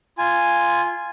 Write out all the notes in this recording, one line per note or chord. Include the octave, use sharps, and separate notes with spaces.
F4 G#5